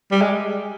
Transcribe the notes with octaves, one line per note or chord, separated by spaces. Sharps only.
G3
G#3